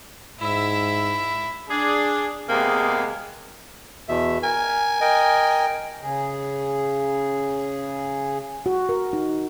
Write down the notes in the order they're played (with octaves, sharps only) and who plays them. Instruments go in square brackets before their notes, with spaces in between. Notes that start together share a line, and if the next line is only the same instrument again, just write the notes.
[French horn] G#2 [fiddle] E4 E5
[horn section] D4 G#4
C3 G#3 A#3 B3 G#4
[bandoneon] E2 B2 E5
[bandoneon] A#4 [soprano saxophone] G#5
[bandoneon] A#4 D#5 G5
[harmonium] C#3 G#4
[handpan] F#4
A#4
D#4